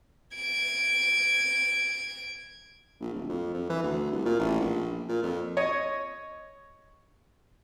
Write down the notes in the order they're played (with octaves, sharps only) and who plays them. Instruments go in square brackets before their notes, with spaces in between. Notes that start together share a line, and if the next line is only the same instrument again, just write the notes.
[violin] G#6 D7
[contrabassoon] A#1
D1
F2
F2
E3
D2
C2
A#2
A1
A#1
A#2
F2
[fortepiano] C#5 D#5